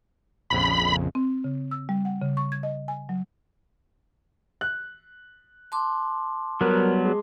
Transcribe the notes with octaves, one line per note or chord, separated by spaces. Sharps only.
A#1 F2 C#3 B5
C4
C#3
E6
G3
F#5
C#3
C#6
G#6
D#5
G#5
F#3
F#6
A5 C6 D6
F#3 G3 B3 A#4
G#3